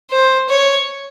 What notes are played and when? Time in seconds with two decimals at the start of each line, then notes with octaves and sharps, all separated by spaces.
0.11 C5
0.49 C#5